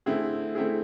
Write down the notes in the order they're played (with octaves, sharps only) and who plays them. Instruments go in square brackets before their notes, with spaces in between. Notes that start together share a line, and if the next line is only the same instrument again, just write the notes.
[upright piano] D3 A3 C4 E4 G#4
D3 A3 C4 E4 G#4